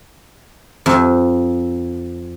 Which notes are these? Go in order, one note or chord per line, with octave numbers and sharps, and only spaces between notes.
F2